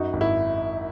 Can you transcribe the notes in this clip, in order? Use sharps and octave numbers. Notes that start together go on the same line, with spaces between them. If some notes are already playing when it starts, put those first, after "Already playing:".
Already playing: F#2 D#4 F#4
G#1
E4